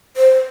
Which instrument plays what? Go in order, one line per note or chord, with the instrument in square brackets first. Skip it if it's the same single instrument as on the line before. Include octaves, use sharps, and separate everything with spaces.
[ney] C5